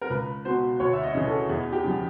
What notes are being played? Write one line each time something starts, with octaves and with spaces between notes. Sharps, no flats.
A#4
C#2 B4
B2 C5
D2 C#5
E5
D#5
C#3 E3
A4
E2 G#4
G4
C#3 F3